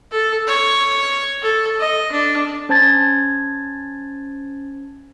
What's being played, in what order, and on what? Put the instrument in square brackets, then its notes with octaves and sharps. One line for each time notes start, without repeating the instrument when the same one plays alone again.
[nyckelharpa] A4
C#5
A4
D#5
D4
[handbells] C#4 C5 A5 G#6 A6